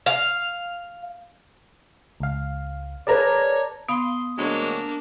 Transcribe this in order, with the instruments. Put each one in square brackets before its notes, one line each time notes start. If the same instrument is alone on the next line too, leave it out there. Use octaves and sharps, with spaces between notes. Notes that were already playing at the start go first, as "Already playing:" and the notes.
[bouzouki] F5
[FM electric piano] C#2 F5
[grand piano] G#4 A#4 B4 [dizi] C#5 [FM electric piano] D5 A5 A#5
[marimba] B3 F5 B5 [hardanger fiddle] C6 [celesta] D#6
[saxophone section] D2 F#3 G#3 [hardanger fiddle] A#3 D4